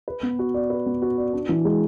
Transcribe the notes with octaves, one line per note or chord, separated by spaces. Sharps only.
B4
B3
F#4
D5
B4
B3
F#4
D5
D4
E3
G#3